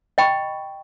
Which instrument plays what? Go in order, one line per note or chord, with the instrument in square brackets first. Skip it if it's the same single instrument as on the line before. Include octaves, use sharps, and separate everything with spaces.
[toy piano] D#5 G5 B5 C#6